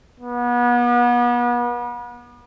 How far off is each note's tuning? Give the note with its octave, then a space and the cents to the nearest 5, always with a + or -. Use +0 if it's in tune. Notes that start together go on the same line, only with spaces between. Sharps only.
B3 -35